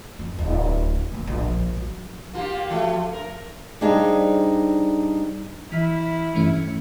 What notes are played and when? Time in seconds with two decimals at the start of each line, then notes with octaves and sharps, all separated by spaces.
0.19 F2 C#4
0.39 D1
1.12 D#3 A#3
1.27 A#1
1.77 F#3
2.33 A#3 F4 G4
2.70 F3 A3
3.13 A#4
3.81 G3 D4 D#4 G#4 C5 F5
5.72 E3 E4 F6 B6
6.35 G2 E3 A3 C#4 C#7